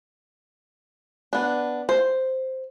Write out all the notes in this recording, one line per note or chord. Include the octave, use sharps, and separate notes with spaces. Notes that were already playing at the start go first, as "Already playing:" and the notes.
B3 D4
C5